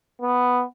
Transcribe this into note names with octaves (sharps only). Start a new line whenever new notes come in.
B3